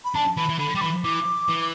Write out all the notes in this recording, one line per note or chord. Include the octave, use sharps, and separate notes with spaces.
B5
D4 A5
E3 B5
E3
D3 B5
G3 D6
E3 B5
E3 D6
E3